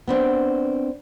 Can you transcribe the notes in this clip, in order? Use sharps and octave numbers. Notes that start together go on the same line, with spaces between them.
B3 C4 D4